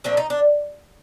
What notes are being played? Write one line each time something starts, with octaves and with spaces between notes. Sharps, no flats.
A#2 F3 A3 C4 D4
D#4
D4